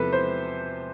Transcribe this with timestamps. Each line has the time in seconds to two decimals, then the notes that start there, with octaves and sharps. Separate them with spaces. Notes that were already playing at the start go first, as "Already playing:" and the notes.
Already playing: E2 C3 F3 A4 B4
0.12 C5